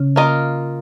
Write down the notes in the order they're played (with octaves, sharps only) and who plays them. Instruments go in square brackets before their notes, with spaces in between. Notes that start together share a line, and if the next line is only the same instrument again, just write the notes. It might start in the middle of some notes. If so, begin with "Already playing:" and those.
Already playing: [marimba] C#3 C#4
[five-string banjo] A#3 F4 A#4 D#5